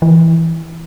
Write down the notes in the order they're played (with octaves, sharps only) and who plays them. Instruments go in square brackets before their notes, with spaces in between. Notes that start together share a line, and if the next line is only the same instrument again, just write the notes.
[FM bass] E3